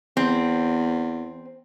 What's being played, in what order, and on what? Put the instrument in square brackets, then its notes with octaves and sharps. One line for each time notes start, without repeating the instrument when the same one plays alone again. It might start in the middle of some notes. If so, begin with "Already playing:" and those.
[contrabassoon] E2 [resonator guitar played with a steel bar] C4